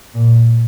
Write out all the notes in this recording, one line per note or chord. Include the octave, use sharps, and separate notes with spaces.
A#2